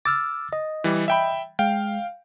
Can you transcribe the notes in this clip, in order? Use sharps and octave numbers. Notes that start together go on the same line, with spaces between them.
D6 E6 F6 A6
D#5
E3 G3
E5 G5 B5
G#3 F5 G5